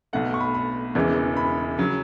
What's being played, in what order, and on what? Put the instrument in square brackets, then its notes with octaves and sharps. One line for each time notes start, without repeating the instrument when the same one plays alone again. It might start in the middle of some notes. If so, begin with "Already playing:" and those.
[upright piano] B1 B2 A3 F#5
C#6
B5
B5
E1 E2 C#3 E3 G#3
B5
C#3 F#3